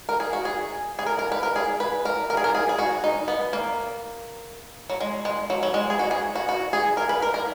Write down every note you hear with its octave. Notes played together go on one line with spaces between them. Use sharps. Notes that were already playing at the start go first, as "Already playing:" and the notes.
A#4
G#4
F#4
G#4
G#4
A#4
A#4
B4
A#4
G#4
B4
A#4
A#4
G#4
A#4
G#4
G#4
F#4
D#4
B3
A#3
F#3
G#3
G#3
F#3
F#3
G#3
G#4
F#4
G#4
F#4
F#4
G#4
A#4
B4
A#4
A#4